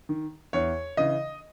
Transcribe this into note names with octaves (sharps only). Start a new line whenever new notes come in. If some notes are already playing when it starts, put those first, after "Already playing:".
D#3
E2 C#5
C#3 E3 D#5